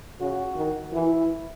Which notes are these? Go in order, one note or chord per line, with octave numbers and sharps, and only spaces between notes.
C#3 F#4
D#3
E3 E4